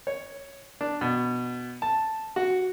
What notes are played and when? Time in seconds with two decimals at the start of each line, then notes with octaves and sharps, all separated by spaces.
0.07 C#5
0.81 D4
1.01 B2
1.82 A5
2.36 F#4